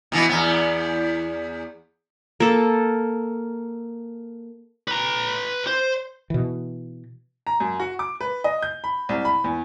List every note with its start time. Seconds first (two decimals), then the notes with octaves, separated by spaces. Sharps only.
0.12 B2 E3 B3
0.29 E2 B3
2.40 A#3 A4
4.88 B4 A#5
5.67 C5
6.30 B2 E3
7.47 A#5
7.60 F#2
7.80 F#4
7.99 D6
8.21 B4
8.44 D#5
8.62 G6
8.84 B5
9.09 C2
9.25 B5
9.44 E2